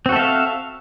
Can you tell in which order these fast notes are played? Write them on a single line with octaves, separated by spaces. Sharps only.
C4 F#4 A4 E5 F5